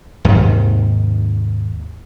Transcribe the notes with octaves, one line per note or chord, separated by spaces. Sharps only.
D#2 G#2 C3 D#3